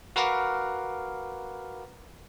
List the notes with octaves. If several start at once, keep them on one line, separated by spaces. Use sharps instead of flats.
F#4 A#4 B4 F5 F#5 D6